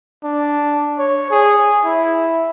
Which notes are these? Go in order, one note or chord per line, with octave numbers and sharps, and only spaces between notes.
D4
C#5
G#4
E4